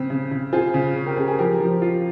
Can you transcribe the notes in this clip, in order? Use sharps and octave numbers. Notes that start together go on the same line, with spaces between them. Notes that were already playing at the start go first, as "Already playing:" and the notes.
Already playing: C#3 C4
C#3
C#3
F4 G#4 C5
C#3
C#4
G4 A#4
C#4 G#4
G#4
F3 G4 A#4
F3
F4